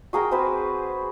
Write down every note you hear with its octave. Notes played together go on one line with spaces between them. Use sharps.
F#4 G#4 A#4 G5
C4 F#4 B4 C5